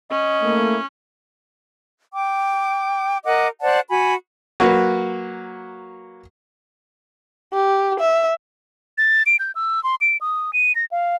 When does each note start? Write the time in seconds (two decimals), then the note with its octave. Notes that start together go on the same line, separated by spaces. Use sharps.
0.11 C#4 D#5
0.42 A3 A#3 E4
2.14 G5 D6
3.24 A#4 D#5 F#5 D6
3.61 C5 D5 F#5 A5
3.88 F#4 G#5 B5
4.60 F#3 A#3 F#4 B4
7.54 G4
8.00 E5
8.98 A6
9.26 D7
9.39 G6
9.55 E6
9.84 C6
10.01 D7
10.21 D#6
10.53 D#7
10.75 A#6
10.91 F5